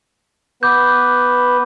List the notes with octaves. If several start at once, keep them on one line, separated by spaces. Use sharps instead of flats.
B3 B4 D6 G6